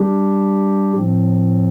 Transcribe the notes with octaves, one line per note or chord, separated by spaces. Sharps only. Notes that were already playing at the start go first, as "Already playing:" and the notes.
Already playing: G3 D4 G4
A2 F3 C4